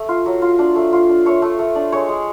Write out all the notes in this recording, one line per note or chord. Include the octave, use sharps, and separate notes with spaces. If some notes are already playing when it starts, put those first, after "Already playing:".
Already playing: A3
F4
F#3
F4
D4
A3
F4
D4
A3 C#5
A3
A3
D4
G#3 C#5
G#3